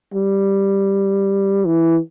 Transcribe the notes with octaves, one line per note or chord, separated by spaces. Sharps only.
G3
E3